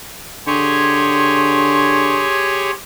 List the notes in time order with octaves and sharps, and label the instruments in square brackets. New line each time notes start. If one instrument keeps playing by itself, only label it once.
[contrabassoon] D3 [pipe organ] G4 G#4 C#5 [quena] C6